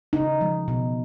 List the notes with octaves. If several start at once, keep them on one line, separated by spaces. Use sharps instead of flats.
C#3 D#4
F3 G#3
B2